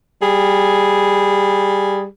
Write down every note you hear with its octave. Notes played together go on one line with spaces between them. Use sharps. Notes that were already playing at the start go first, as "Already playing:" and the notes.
G3 G#4